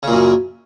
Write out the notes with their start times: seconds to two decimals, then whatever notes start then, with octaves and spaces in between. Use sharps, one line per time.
0.03 C#3
0.08 A#2
0.12 F#2